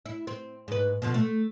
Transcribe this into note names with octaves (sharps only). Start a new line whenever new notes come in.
E4
C4
G#2 B4
B2 D3 F3
A3